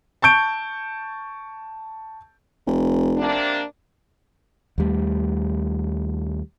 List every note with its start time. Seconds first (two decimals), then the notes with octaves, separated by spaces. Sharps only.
0.22 A5 C#6 G6 D7
2.67 F1
3.17 C3 A#3 D4
4.78 D#2 G3 A3